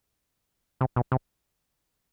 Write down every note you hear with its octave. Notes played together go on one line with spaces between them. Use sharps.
C3
B2
C3